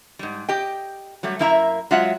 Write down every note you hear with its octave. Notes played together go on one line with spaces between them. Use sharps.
G#2 G3
G4 D#5 G5
F#3 G3 A3
F#2 A#3 E4 E5 A#5
F#3 G#3 F4 E5 F#5